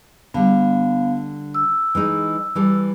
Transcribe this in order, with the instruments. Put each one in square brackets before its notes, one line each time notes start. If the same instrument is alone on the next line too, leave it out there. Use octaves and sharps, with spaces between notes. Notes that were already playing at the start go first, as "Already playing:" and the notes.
[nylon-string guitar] D3 G3 [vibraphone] B3 F5
[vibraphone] E6
[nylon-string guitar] E3 G#3 D#4
E3 G3 A4